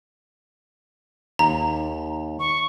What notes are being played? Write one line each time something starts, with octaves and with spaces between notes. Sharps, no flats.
D#2 A#5
C#6